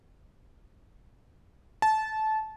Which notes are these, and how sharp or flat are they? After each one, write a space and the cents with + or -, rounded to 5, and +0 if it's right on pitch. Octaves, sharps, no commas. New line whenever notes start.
A5 -20